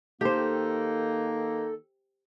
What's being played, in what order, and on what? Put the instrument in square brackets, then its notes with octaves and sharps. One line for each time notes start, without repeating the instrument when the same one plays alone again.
[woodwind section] D#3 A#3 D#4 [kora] G4 C5 [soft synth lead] A4